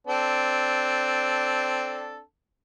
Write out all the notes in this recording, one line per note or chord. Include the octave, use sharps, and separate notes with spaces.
C4 D4 A4